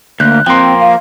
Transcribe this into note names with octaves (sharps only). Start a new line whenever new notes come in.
D2 A#3 F#6 G6
F3 A#3 C4 G5 C6
F5